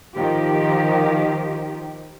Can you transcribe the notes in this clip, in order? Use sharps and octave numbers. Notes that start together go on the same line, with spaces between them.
D#3 F3 G4